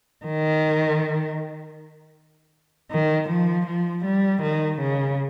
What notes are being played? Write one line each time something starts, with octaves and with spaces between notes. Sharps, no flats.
D#3
D#3
F3
F3
G3
D#3
C#3